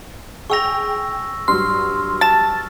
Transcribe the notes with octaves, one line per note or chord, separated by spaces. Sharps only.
G#4 G5 C#6 E6 A#6 F7
G2 F#3 C6 F6
A5 A6